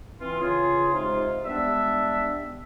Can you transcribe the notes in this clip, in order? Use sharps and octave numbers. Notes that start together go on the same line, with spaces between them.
E3 C4 F4
C#3 F4 G#4
C3 G#3 D#4 F4
G3 G#3 B3 D4 E5